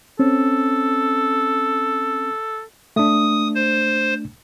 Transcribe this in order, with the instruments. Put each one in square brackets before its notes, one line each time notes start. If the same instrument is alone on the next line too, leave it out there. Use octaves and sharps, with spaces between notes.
[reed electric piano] C4 C#4 [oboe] A4
[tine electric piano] A3 D4 [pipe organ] D#6
[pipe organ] C5